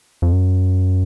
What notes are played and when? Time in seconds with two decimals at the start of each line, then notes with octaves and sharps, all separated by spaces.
0.22 F2
0.32 F#2